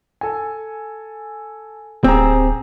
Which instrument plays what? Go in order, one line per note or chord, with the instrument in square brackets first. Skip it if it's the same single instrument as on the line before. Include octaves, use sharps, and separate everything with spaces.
[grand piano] A4 G#5
[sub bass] D1 [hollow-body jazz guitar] C4 [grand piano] G4 G#4 A#5